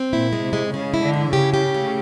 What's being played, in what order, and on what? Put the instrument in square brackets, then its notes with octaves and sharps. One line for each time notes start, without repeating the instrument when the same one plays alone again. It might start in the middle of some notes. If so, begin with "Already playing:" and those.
Already playing: [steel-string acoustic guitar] C4
[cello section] A#2 [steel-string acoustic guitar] E4
[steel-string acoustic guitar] G#3
[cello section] C3
[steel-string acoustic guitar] G#3
[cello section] C#3 [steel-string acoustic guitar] G#3
[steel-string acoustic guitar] E4
[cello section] D3
[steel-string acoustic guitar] E4
[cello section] C#3 [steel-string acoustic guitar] G4
[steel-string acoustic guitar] G4
A3